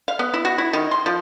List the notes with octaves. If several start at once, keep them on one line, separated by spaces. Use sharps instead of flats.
F5
B3
E4
F#4
E4
D#3
C6
F3